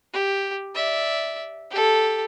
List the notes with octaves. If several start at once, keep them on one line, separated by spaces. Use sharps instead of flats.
G4
D5 E5
G4 A4